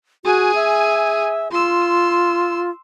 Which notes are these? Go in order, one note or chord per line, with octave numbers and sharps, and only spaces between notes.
F#4 G#4 G#5
E5
F4 C6 E6